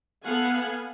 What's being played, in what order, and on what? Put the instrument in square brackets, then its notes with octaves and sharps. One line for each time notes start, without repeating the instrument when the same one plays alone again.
[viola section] B3 A4 F5 F#5 G#5